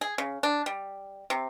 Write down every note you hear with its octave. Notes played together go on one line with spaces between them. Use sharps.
G#4
C#3
D4
G3
C3